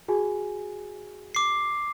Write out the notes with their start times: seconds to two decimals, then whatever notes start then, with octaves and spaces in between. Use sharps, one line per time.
0.08 F#4 G#4 G#5
1.35 D6 C7